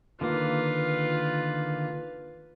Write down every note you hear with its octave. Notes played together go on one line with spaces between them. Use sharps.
D3 D#3 A#3 F4 B4